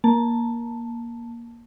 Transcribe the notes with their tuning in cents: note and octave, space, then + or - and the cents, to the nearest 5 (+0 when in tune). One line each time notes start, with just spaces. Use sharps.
A#3 +15 A5 +5